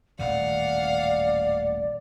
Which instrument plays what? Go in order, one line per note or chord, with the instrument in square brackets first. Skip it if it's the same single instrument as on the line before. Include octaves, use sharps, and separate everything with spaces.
[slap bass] D#1 A1 D#3 [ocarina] D5 [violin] F5 F#5